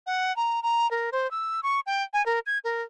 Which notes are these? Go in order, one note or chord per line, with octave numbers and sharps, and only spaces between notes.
F#5
A#5
A#5
A#4
C5
E6
C#6
G5
G#5
A#4
G#6
A#4